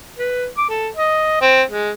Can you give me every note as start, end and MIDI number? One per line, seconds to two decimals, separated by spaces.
0.18 0.46 71
0.57 0.67 86
0.70 0.89 69
0.97 1.38 75
1.41 1.63 60
1.71 1.90 56